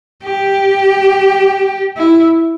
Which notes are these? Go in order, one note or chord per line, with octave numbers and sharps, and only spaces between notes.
G4
E4